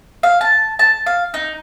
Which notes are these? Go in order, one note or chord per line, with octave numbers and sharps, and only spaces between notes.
F5
A5
A5
F5
D#4